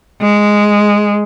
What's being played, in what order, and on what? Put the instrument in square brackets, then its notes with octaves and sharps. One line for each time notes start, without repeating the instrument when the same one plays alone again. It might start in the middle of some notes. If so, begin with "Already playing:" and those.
[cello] G#3